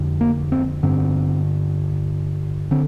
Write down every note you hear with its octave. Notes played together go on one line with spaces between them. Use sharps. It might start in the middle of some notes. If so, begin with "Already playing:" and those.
Already playing: F2 D3
A#3
C4
G2 D3 C4
D3 C4